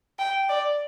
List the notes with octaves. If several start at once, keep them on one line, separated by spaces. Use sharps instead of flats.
G5
D5